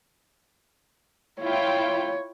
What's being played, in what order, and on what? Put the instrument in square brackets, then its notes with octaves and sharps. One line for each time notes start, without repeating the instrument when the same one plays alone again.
[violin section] E4 F4 G5 [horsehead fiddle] C#5